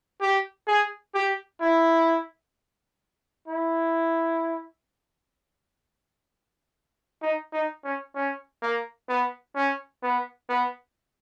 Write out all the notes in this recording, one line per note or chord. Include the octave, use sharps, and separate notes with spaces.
G4
G#4
G4
E4
E4
D#4
D#4
C#4
C#4
A#3
B3
C#4
B3
B3